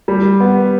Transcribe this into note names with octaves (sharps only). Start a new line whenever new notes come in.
G3
B3